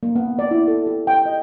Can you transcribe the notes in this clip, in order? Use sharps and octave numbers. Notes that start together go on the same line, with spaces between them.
A#3
B3
D5
E4
A4
G4
G5
D#5